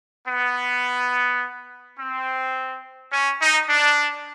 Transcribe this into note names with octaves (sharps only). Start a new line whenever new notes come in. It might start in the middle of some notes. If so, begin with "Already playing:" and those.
B3
C4
C#4
D#4
D4